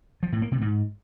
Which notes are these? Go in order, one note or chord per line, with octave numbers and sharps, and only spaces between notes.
F3
A2
A#3
C3
G#2